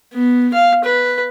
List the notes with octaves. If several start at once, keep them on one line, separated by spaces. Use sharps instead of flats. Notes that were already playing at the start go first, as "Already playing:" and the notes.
B3
F5
B4